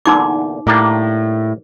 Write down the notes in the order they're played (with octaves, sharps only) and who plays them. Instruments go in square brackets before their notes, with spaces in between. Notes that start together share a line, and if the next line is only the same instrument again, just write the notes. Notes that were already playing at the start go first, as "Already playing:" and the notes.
[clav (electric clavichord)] E2 A#2 D3 [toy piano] D#4 D6
[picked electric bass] A2 [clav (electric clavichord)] G3 A#3 D4